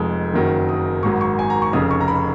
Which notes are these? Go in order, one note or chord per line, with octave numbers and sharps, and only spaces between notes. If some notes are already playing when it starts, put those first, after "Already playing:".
Already playing: F1 F2 F3 G#3 D#6
F#1 F#2 D#3 F#3
D#6
G#1 G#2 F#3 C#6
C#6
G#5
A#5
C#6
F1 F2 C#3 D#6
C#6
A#5
B5